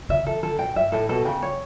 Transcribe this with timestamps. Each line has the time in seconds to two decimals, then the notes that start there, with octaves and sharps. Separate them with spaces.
0.09 C#3 E5
0.26 E3 A4
0.43 D3 A4
0.59 B2 G5
0.76 G2 E5
0.92 A2 A4
1.09 B2 A4
1.25 C#3 G5
1.42 C#5